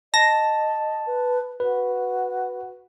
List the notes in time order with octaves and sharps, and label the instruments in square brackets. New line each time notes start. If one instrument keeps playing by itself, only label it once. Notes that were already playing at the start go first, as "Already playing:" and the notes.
[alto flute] D#5 [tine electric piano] A5 [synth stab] A#6
[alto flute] B4
[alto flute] F#4 [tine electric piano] B4